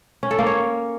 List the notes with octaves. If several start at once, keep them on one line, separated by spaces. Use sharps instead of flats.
C#4
A4
A#3
C#5